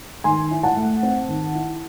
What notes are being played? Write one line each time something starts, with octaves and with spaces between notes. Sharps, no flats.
D#3 G#5 C6
E4
F#5 A5
A3
C4
D#3
E4